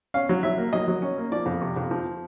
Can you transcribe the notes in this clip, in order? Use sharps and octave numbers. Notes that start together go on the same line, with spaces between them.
C#4 F5
F#3
F#3 E5
A#3
F#3 D#5
F#3
C#4
A#3
F3 D5
F2
C3
F2
F3